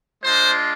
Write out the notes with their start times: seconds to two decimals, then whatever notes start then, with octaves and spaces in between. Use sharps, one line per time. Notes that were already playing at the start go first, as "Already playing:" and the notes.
0.23 G#3 D4 F4 C5